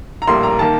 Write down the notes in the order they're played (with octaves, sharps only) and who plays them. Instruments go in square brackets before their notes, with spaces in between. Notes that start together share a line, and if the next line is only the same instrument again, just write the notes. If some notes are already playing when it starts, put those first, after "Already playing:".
[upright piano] A#5
A#1 A2 G3 A#3 C6
A#5
D#3 A#3 A5